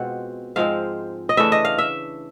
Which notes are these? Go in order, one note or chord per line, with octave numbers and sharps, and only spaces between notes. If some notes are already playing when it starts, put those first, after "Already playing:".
Already playing: B2 G#3 C4 F4 F#5
G#2 F3 G#3 C4 F5
D#5
C#3 E3 A3 D4 E5
D#5
F5
E5